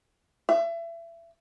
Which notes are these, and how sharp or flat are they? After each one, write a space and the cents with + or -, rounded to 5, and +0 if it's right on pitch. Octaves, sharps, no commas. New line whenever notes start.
E5 +30